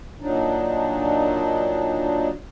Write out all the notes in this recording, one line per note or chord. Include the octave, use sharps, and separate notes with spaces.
A#2 F#3 D4 D#4